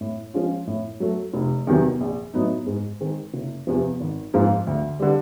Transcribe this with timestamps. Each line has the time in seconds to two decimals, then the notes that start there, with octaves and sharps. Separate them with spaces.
0.01 A2
0.34 F3 G#3 C#4 F4
0.67 A2
1.00 F#3 A3
1.34 F1
1.67 E2 C3 D#3 F#3
2.01 A#1
2.34 A2 F#3 B3 D#4
2.67 G#2
3.00 D#3 G#3 C4
3.34 F#1
3.67 E2 C3 F3
4.00 G#1
4.34 G#2 F3 A#3
4.67 D2
5.00 D3 G3